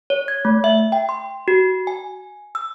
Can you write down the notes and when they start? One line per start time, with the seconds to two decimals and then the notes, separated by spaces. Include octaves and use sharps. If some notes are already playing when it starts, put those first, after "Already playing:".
0.10 C#5
0.28 G#6
0.45 A3
0.64 E5
0.92 G5
1.09 C6
1.48 F#4
1.87 G#5
2.55 E6